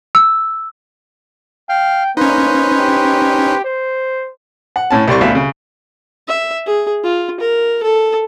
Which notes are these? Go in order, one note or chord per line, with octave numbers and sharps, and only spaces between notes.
E6
F5 G5
A#3 C#4 D#4 B4 C5
G4
C5
F#5
A2 C#4 A5
C2 G3 D5 C6 C#6
D2 B2 E5 F5
C#3
E5
G#4
F4
A#4
A4